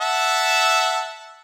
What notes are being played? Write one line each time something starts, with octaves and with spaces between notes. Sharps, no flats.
E5 F#5 A5